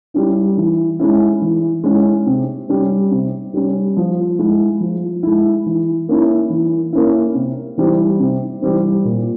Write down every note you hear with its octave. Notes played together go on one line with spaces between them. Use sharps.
G3 C#4 E4
E3
G#3 C#4 E4
E3
G#3 C#4 E4
C3
G3 C#4
C3
G3 C#4
F3
G#3 E4
F3
G#3 E4
E3
A#3 C#4 E4
E3
A#3 C#4 E4
C3
E3 G3 C4
C3
E3 G3 C4
A#2